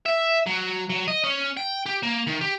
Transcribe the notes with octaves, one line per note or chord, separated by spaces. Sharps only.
E5
F#3
F#3
D#5
C#4
G5
G4
A#3
D#3
G4